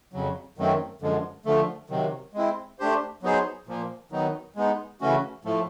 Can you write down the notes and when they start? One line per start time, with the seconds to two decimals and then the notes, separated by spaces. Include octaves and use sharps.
0.13 F2 C#3 F#3
0.58 F#2 D#3 F#3 A3 C4
1.02 F#2 D3 F3 G#3
1.45 D3 F3 A3
1.90 C3 D#3 F#3
2.34 G#3 C4 E4
2.79 A3 D4 G4 C5
3.22 F#3 B3 D#4 G#4 C5
3.67 A#2 F3 A#3
4.12 D#3 F#3 B3 D#4
4.56 G#3 B3 D#4
5.01 C#3 E3 A3 C#4 F#4
5.45 A2 F3 A3